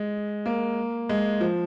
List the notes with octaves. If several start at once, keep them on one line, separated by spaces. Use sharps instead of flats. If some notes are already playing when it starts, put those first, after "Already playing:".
Already playing: G#3
A#3
G#3
F3